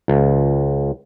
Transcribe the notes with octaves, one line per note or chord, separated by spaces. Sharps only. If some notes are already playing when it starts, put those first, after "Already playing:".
C#2